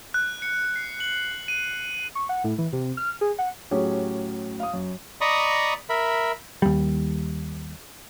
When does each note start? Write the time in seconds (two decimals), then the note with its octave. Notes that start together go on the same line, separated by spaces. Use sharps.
0.14 F#6
0.42 C#7
0.76 C7
1.00 F#7
1.48 D#7
2.15 C#6
2.29 F#5
2.44 A2
2.58 E3
2.73 C3
2.97 F6
3.21 G#4
3.39 F#5
3.71 A2 F#3 C#4 G4 G#4
4.60 F5 D#6
4.73 F#2
5.21 D5 D#5 A#5 B5 C#6 D#6
5.89 A#4 E5 B5
6.62 D#2 G3